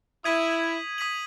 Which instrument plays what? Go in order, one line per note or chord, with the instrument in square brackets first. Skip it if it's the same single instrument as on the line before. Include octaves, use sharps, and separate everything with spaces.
[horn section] E4 [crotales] D#6 G#6 B6 D#7 F#7
[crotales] D#6 G#6 B6 D#7 F#7